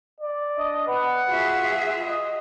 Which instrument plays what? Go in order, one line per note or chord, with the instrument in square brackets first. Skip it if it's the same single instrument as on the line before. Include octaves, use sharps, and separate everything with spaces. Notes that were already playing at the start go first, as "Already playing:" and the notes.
[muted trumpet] D5
[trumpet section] D4 D#5
[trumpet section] B4 [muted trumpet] F#5
[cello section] F4 G#4 E5 [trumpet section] F#4
[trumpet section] D#5